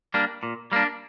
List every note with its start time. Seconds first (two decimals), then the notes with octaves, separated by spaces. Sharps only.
0.14 G3 A#3 D4
0.43 A#2
0.72 G3 A#3 D4